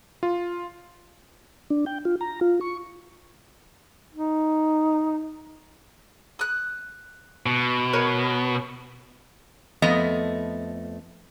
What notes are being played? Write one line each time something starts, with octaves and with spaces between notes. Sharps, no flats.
F4
D4
G5
F4
A#5
F4
C#6
D#4
D#6 F#6
B2
A#4 B4 C#5
F2 A3 B3 D#5